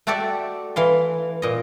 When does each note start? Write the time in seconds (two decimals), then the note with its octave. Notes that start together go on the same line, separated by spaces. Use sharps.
0.07 A3 F#4 G4 A4 D5 E5
0.76 E3 F5 C6
1.42 A#2 D#5